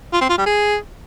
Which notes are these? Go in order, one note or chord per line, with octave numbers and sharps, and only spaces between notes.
F4
C4
F4
G3
G#4